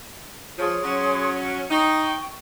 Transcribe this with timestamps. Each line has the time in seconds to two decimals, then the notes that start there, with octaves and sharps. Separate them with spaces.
0.58 F3 G#4 C#5 C6
0.83 F#3 C#4
1.71 D#4 G5 C#6